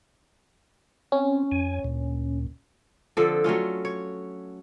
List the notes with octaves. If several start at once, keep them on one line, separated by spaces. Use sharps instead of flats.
C4 C#4
F2 G#5
D2 A#2
D3 F3 C4 A4
F#3 A3 C#4 F4
C#5